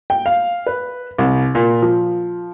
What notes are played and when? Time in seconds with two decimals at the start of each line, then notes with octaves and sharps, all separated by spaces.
0.10 G5
0.26 F5
0.66 B4
1.18 C2
1.55 A#2
1.82 F3